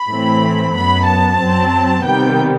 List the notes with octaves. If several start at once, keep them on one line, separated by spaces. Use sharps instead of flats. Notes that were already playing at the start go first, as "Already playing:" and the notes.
Already playing: B5
A2 E3 A3 C4
F#2 F#3 B3 B5
A5
F#2 F#3 C4
C3 D#3 G3 B3 G5